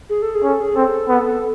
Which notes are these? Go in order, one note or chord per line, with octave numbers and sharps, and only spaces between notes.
G#4
A4
G#4
C#4 A4
G#4
C4 A4
B3